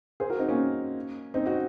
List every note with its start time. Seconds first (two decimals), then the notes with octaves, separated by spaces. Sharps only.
0.20 G#4 C5
0.30 F#4 A#4
0.39 C4 D#4
0.49 A#3 C#4
1.34 C4 D#4
1.46 D#4 F#4